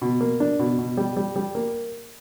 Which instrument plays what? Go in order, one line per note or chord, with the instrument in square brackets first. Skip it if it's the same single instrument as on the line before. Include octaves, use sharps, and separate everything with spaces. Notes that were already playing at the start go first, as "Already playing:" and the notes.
[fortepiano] B2
A#3
D4
B2
B2
G3
G3
G3
A#3